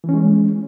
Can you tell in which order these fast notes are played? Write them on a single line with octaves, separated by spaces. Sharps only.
E3 C#4 G#3